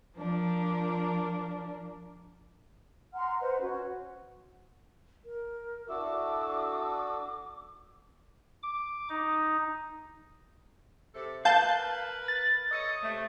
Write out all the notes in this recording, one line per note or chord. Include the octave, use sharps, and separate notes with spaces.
F3 D4 A#4
F#5 A#5 C6 F6
B4 C5 D#5 F#5
C#4 F#4
A#4
D4 E4 F#4 A4 D6 E6
D6
D#4
C3 G4 A4
A#4 B4 F5 A5 G6
A6
A4 C#5 D#5
C3 A3